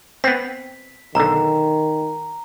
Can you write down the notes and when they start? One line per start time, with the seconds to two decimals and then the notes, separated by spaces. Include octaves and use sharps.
0.24 B3 C4 B6
1.15 B1 D3 D#3 A#5